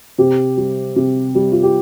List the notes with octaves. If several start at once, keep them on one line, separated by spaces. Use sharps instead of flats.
C3 G4
G3
C3
G3
F4
G4